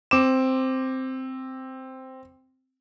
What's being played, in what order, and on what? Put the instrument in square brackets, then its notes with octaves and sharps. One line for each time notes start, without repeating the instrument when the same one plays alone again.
[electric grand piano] C4 D6 E7